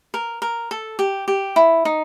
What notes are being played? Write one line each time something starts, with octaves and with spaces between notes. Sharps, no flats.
A#4
A#4
A4
G4
G4
E4
D#4